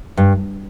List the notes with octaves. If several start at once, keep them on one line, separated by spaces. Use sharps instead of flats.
G2